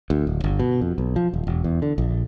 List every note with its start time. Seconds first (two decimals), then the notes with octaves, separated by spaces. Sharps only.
0.10 D2
0.27 D1
0.44 G1
0.59 B2
0.81 F2
0.98 B1
1.16 F3
1.34 D#1
1.47 E1
1.64 E2
1.82 D3
1.98 A#1